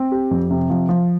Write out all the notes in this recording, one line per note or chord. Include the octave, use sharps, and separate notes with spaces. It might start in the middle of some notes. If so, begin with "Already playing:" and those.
Already playing: C4
G4
F2
C3
F3
F3